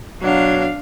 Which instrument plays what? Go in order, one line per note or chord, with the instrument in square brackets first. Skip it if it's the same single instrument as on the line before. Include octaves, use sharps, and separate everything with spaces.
[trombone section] B2 F#3 [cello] D4 F5